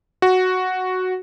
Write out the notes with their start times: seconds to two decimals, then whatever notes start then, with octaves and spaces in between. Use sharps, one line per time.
0.22 F#4